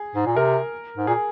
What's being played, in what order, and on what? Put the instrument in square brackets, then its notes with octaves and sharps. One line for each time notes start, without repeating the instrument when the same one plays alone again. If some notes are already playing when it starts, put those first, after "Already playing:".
Already playing: [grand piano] G#4
[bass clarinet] G#2
A#2
[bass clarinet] C3 [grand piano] A#4
[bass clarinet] G#2
[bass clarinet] A#2 [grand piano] G#4